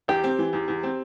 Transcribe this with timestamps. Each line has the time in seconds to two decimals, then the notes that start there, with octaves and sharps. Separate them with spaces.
0.08 E2 G4
0.24 C4
0.38 E3
0.53 E2
0.68 E2
0.83 C4